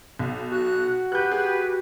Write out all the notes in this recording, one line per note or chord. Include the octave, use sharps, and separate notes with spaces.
B1
F#4 F#6
G4 B4 F#6 G6
G#4